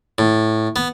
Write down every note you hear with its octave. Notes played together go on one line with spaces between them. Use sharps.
A2
B3